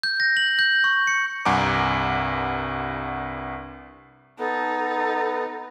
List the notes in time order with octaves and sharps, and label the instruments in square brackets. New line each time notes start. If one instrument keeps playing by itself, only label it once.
[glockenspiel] G6
A#6
F#7
G6
C#6
C#7
[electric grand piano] C2 G2 F#5 G#5 A#5 D6
[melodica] B3 [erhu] D#4 [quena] A4